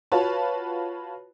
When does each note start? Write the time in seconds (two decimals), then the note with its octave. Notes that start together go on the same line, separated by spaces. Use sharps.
0.12 F4 F#4 B4 C#5 A5